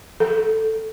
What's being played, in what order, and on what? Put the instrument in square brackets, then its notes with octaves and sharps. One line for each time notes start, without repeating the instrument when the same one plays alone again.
[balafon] A4